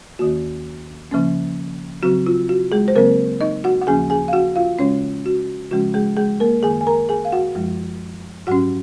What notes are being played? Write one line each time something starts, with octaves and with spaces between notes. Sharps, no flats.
D#2 D#3 A#3 F#4
C#3 F3 A#3 C#4
C#3 F#3 C4 F#4
F4
F#4
G#3 G#4
C5
C#3 F#3 A#3 C4 A#4
D#4 D#5
F#4 F#5
F#5
D#2 C#3 F3 A#3 C#4 G#4 G#5
G#4 G#5
F5
F#4 F#5
F4 F5
C#3 G#3 C#4 C#5
F#4
C#3 F3 G#3 C#4 F#4
G#3 G#4
G#3 G#4
A#3 A#4
F#2 D#3 A#3 G#4 G#5
G#5
A#4 A#5
G#4 G#5
F5
F#4 F#5
F#2 F3 G#3
G#2 F#3 C#4 F#4 F#5